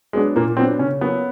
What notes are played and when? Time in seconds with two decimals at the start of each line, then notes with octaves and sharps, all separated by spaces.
0.13 F#3 G#3 B3 D4
0.36 A#2 A#3
0.57 F#3 B3 C4 D4
0.79 C#3 C#4
1.01 F#3 A#3 B3 C#4 F#4